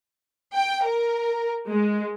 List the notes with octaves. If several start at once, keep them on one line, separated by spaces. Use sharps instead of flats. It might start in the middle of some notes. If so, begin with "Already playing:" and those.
G5
A#4
G#3